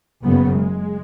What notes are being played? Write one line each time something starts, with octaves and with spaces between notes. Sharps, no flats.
F#1 F#2 C#3 B3
G#3